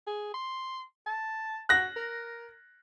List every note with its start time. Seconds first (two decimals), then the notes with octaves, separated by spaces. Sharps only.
0.07 G#4
0.34 C6
1.06 A5
1.69 F#4 F#6 A#6
1.96 A#4